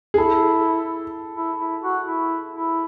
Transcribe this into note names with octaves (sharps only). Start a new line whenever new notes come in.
G#4
E4 A4
E4
E4
F#4
E4
E4